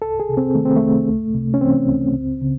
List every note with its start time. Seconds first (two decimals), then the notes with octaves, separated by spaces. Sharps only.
0.02 C2 A4
0.20 G#4
0.29 C3
0.37 C4
0.55 D#3 A3
0.65 C4
0.76 A3
0.82 C2
1.08 C#2
1.34 C3
1.54 C#4
1.61 E3 C4
1.87 C#2
2.14 C#2
2.41 C#3